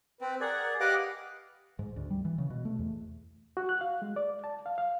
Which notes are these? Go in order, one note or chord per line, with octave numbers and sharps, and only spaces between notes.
C4 B4
G#4 A#4 D5 F#5
G4 B4 D#5 F5 F#5 D6
G#2
D2
G3
E3
C#3
B2
A3
E2
F#4
F#6
F5
G#3
D5
A5
F5
F5